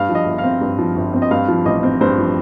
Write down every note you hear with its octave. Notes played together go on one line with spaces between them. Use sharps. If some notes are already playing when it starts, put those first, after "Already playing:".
Already playing: G2 F5
F3
D#5
G1
F5
C4
G2
F3
G1
C4
D#5
G2 F5
F3
A1 D#5
C4
G2 C5
F3